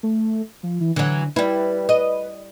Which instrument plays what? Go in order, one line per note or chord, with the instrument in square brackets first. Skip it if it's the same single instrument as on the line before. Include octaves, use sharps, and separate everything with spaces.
[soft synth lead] A3
F3
E3
[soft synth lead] D3 [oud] E3 F#3
[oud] G3 E4 [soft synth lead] B4
[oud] D#5